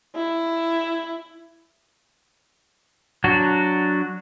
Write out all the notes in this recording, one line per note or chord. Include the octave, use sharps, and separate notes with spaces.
E4
F#3 D4 F#4